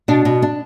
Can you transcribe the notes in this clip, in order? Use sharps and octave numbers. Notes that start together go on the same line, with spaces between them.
B2 D4
B2
D4